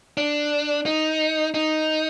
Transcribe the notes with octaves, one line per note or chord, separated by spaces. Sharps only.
D4
D#4
D#4